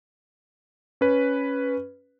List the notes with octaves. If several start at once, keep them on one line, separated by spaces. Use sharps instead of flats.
C#4 B4